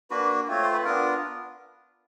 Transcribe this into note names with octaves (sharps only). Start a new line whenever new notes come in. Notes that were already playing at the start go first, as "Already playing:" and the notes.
A#3 D4 F#4 B4
A3 C4 F4 C#5
C5
B4
B3 D4 F4 A#4